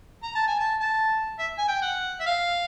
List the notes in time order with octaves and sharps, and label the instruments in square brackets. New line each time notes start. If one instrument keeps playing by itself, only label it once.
[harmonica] A#5
A5
G#5
A5
A5
E5
G#5
G5
F#5
E5
F5